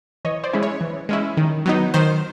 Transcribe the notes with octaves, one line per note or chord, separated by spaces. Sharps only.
E3 C#5 D#5
C5 D5
G#3 C#4 E4
C#5
E3
G#3 C#4 E4
D#3
F#3 B3 D#4
D#3 C5